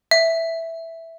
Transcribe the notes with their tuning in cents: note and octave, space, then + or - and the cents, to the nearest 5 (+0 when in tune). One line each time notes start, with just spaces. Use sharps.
E5 +0